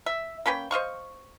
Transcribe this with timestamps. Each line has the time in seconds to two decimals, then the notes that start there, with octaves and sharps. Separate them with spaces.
0.06 E5
0.46 A#3 C#4 B4 G5
0.71 C5 D#5 F5 C#6